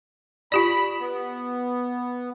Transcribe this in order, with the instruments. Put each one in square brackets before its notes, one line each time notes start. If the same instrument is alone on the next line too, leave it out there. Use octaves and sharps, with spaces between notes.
[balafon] F4 G4 D5 [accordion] B5
[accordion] B3